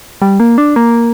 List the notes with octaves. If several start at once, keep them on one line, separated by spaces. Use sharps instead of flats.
G3
A#3
D4
A#3